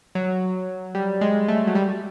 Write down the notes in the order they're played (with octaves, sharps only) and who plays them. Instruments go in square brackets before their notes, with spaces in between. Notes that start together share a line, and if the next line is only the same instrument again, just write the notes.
[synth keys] F#3
G3
G#3
A3
F#3
G3